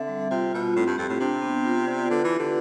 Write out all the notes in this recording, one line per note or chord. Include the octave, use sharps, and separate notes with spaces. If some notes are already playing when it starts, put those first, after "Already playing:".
Already playing: D3 C4 E5
G3
C3 F4
B2 F4
A2 C4
G2
F2 G4
A2
C3 D4
B3
F4
D5
D3 B4
E3
G4
D3